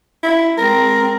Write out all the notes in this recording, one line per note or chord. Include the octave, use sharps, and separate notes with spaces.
E4
G#3 C4 A#4